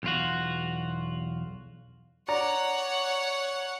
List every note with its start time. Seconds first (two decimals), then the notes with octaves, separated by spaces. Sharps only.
0.03 B1 E2 F4 F#4
2.28 C#5 D5 F#5 A#5